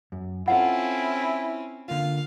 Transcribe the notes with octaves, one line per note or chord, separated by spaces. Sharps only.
F#2
C4 C#4 E4 F4 A4 F#5
D3 A#3 F4 F5